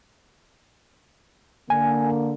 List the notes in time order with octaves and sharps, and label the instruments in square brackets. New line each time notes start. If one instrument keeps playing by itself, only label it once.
[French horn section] D3 A#3 [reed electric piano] G#5